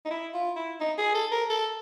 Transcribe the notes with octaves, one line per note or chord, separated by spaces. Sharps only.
D#4
E4
F4
E4
D#4
G#4
A4
A#4
A4